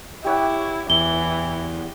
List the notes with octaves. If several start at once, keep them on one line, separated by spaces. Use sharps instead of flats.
E4 G4 C#5 F#5
E2 E3 G7